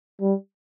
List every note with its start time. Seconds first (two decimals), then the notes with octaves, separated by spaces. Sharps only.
0.21 G3